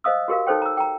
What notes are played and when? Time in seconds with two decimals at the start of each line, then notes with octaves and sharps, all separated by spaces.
0.04 C5 D#5 F5 D#6 E6
0.28 F#4 G4 A#4 F5
0.47 D#4 A4 C5 C#5 G5
0.62 A#5 E6
0.77 G5 A#5